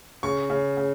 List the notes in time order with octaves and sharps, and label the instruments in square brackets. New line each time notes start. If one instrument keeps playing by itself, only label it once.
[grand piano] C#3 C#6
C#3
C#3